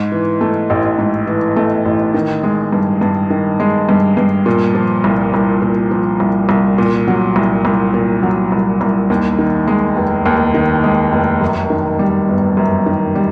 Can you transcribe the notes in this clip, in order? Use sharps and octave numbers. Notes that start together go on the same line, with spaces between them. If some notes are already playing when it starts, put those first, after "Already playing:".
Already playing: G#2
E3
A3
A1
G#2
E3
A3
A1
D#3
G#3
G2
G2
D#3
G#3
G2
G2
A#2
F3
C2
C2
A#2
F3
C2
C2
A#2
F#3
C2
C2
A#2
F#3
C2
C2
D#2
D#3
G#3
F1
D#2
D#3
G#3
F1
F#2
D#3
G3
G1
F#2
D#3
G3